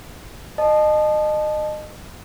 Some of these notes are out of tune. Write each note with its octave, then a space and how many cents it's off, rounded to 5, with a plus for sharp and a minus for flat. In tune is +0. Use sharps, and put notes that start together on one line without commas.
D#5 -30 A5 -20